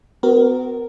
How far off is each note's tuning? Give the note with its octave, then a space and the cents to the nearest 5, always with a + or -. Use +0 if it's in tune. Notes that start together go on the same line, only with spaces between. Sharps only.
B3 +40 F#4 +10 A#4 +0